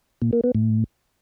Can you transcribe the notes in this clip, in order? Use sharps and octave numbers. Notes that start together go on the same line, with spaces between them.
A#2
A#3
B3
A2